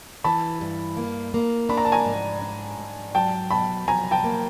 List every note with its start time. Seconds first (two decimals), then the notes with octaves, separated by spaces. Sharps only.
0.24 E3 A5 B5
0.61 G2
0.97 A#3
1.34 A#3
1.69 D4 B5
1.78 A#5
1.85 A5
1.92 G#5 A#5
2.06 G#2
2.42 D4
2.79 G#2
3.15 F#3 G5 A5
3.51 B2 A5 B5
3.87 F#3 G#5 A#5
4.11 G5 A5
4.24 A#3